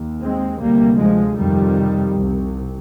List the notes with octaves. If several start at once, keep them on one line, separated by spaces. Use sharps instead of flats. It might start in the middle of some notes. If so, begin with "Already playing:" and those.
Already playing: D#2
G#3 C4
D2 C3 G3 A#3
F3 G#3
F2 C3 D#3 G3
C2 C3